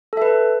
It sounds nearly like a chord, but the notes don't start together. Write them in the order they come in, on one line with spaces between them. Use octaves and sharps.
A4 E5 B4